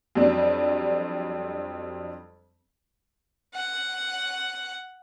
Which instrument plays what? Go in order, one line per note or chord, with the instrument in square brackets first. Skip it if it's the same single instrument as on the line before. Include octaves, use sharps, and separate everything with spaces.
[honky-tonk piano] F2 F#3 G3 C4 D4
[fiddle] F#5